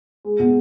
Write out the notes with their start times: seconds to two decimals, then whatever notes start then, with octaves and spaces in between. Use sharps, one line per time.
0.25 G#3
0.40 B2